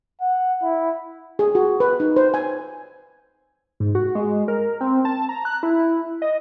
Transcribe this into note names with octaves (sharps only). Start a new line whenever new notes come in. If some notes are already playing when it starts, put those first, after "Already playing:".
F#5
E4
G#4
F#4
B4
D#4
C5
G#5
G#2
F#4
G#3
A#4
C4
A5
A#5
F#6
E4
D#5